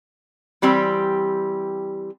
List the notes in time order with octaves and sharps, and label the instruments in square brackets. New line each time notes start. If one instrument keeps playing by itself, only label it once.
[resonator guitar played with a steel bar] E3 G3 C4 G4